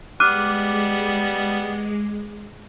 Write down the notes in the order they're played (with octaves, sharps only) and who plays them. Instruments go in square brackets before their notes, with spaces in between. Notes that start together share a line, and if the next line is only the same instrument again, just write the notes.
[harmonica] G3 B3 [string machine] G#3 [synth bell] D6 [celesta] F6 F#6 D#7